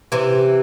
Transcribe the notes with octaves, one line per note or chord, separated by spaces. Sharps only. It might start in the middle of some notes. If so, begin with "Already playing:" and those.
C3 E3